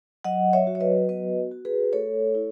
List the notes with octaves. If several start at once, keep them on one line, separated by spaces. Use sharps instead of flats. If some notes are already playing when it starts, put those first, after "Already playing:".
F#3 D#5 F#5
C#5 E5
F#4
C#5
B4 D#5
B3 B4 D#5
F#4
G#4 B4
A3 A4 C#5
E4